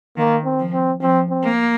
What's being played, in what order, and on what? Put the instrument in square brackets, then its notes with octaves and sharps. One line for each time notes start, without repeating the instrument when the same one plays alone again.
[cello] D#3 [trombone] A#3
[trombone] C4
[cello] F3
[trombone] C4
[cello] F3 [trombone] C4
[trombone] C4
[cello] A#3